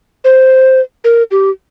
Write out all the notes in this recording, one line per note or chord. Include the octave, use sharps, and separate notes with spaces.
C5
A#4
G4